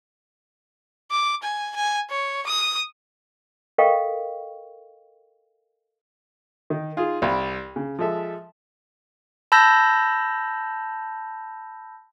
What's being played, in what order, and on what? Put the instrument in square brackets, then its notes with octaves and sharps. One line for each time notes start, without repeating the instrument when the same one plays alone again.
[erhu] D6
G#5
G#5
C#5
D#6
[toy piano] A4 A#4 D#5 F5 G5 C#6
[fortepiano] D#3
D#4 F4 G#4
C2 D5 F5 B5
C#3
F3 G#3 A4 E5
[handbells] A5 B5 E6 G6 A#6